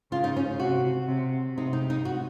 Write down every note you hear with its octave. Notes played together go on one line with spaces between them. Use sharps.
C#3 F4
D#4
C#4
C3 F#4
C3
C3 D#4
D#4
D#4
F#4